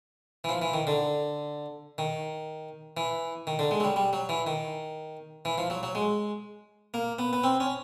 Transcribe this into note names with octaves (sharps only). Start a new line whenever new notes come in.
E3
F3
E3
D#3
D3
D#3
E3
D#3
D3
G#3
F#3
G3
G3
F#3
E3
D#3
E3
F3
F#3
F#3
G#3
A#3
B3
B3
C4
C#4